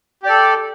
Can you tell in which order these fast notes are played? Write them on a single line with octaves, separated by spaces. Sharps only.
G4 D5 A4